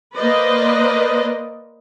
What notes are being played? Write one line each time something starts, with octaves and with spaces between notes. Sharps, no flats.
A#3 B4 C5 D5 D#5